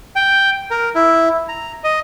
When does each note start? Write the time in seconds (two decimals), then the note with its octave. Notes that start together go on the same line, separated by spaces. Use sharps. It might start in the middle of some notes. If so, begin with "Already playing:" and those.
0.16 G5
0.71 A#4
0.95 E4
1.49 A#5
1.84 D#5